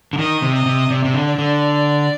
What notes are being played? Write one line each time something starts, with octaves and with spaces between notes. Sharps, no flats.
D3
D#3 D#5
C3
D#5
C3
C3 D5
C3
D3
D5
D3